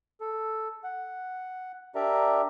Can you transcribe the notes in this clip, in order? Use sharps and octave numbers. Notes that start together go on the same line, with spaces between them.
A4
F#5
D4 G4 A#4 D5 E5 A#5